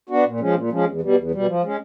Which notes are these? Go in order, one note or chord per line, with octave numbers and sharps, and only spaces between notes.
B3 D4 F#4
A#2
F3 G#3 C#4
A#2
F3 G#3 C#4
E2
B2 G3
E2
B2 G3
F3
G#3 C#4